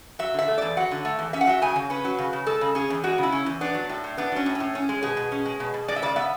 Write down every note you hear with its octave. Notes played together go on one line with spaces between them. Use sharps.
F#3 E5
D3 E5
A3
E2 D5
F#3 F#5
D3
A3
E2
C#4 E5
F#5
F#3 E5
C#3 G#5
C#3
C#4 B4
F#3
C#3
C#3
G#3 A4
C#3
C#4 G#4
E2
G#3 F#4
C#3 E4
C#4
E2
B3 D4
F#3
A2
A2
B3 D4
F#3 C#4
A2
C#4
A2
C#4
G#3
B2 G#4
B2
C#4
G#3
B2
B2
G#3 D5
E5
C#3 D5
B3 E5